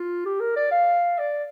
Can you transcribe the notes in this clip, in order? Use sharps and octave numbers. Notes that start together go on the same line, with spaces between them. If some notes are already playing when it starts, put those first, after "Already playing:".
Already playing: F4
G4
A#4
D5
F5
D5